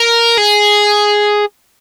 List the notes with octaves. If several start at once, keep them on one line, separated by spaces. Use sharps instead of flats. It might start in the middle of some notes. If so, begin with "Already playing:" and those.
Already playing: A#4
G#4